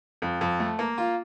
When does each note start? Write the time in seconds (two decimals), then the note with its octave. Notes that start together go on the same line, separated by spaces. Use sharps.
0.22 F2
0.41 F2
0.60 A3
0.79 A#3
0.98 F4